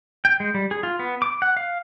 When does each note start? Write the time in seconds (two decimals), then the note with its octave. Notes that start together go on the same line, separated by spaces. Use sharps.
0.25 G5
0.40 G#3
0.54 G3
0.71 G#4
0.83 F4
0.99 B3
1.22 D6
1.42 F#5
1.57 F5